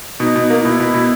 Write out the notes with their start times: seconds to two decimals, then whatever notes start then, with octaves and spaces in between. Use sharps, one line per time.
0.20 B2 D#4
0.35 B2 D#4
0.50 A#3
0.61 B2 E4
0.80 B2
0.94 B2